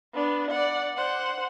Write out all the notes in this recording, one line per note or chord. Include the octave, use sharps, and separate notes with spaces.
B3 D4
D5 F#5
C5 F#5